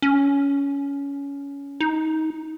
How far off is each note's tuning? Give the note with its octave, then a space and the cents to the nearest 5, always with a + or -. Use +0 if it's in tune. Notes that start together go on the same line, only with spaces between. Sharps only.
C#4 +20
D#4 +25